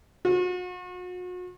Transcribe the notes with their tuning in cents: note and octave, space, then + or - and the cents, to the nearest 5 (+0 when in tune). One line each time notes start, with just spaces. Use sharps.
F#4 -40